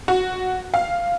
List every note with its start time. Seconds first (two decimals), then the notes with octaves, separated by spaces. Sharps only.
0.08 F#4
0.74 F5